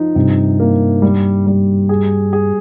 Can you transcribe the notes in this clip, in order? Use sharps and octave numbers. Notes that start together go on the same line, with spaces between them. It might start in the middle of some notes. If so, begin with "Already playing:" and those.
Already playing: F3 D#4
G2 C3
A#3
G3
G3
G#4
G#4